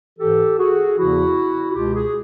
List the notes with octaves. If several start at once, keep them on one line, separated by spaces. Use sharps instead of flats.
G#2 E3 G4 A4
F#4 G#4
E2 C#3 F3 E4 F#4
F#4
C#2 B2 F4 G4
F#4 G#4